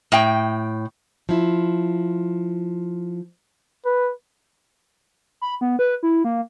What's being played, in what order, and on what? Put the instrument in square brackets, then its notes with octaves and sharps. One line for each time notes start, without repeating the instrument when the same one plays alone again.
[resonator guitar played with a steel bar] A2 G5
[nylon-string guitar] F3 E4
[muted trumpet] B4
[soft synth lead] B5
B3
B4
E4
A#3